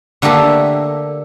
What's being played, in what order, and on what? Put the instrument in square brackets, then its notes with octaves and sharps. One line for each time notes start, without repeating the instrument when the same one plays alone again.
[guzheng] D3 A3 A#3 G4 A4